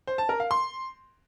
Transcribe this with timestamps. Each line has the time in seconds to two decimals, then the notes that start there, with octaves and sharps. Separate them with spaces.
0.07 C5
0.18 A5
0.29 A#4
0.40 F5
0.51 C6